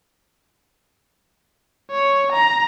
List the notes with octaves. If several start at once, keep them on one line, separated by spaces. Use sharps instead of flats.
C#5
A#5